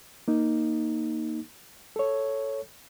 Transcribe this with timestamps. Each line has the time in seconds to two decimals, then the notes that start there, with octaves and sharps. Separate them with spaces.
0.28 A#3 D#4
1.96 A4 C#5